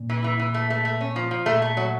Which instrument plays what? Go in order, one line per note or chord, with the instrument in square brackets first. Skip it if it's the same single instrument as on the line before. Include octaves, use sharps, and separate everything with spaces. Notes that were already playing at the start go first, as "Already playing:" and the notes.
Already playing: [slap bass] A#2
[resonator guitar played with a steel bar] E3
E3
E3
A3
A3
A3
C#4
F3
F3
[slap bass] A#2 [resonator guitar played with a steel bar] A3
[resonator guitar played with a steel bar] A3
F#3